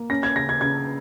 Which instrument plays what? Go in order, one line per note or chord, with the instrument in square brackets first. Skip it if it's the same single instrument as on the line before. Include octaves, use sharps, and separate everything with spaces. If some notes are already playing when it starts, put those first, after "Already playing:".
Already playing: [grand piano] A#3
C#4 A#6
G#6
C#3 A#6
G#6
C#3 G#6